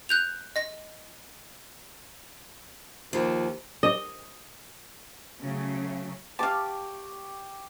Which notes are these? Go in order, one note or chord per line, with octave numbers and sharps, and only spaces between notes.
F#6 G6 F7
D#5 A#6
D#2 F3
D#5
C#3 F#3 A3
G4 F5 A5 C#6 D6